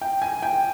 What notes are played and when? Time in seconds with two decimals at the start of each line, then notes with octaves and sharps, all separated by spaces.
0.01 G5
0.22 G#5
0.43 G5